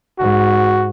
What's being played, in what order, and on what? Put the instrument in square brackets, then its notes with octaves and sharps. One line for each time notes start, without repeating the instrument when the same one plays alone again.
[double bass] G#2 [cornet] F#4